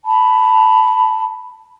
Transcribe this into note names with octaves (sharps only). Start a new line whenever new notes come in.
A5 B5